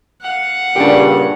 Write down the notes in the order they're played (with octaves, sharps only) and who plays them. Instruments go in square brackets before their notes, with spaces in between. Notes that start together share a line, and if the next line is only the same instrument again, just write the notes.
[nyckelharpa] F5 F#5
[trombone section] G2 A#2 C#3 [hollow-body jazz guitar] D4 G4